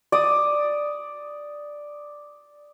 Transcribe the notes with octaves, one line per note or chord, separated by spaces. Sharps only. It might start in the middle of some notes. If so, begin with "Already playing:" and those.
D5 D#6